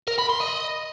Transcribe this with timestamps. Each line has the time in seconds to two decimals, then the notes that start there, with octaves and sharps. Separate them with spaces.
0.08 A#4
0.19 B5
0.30 C6
0.41 D#5